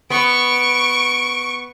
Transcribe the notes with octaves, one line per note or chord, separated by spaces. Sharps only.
B3 C#6 D7